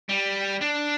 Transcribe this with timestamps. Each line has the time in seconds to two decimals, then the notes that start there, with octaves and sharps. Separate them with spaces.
0.09 G3
0.61 D4